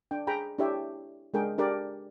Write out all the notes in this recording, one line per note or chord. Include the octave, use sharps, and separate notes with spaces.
D4 G5
G#4 G5 A#5 B5
D4 E4 G4 C#5 E5 G5
G#3 D4 G#4 A#4 G5
D4 G4 A#4 D5